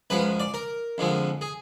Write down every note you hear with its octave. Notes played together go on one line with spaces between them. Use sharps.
F#2 F3 G#3 B4
D5
A#4
F2 D3 F3 G#3
G#4